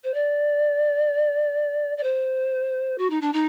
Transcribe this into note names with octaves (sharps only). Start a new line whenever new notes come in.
C5
D5
D5
C5
F#4
D#4
D4
D#4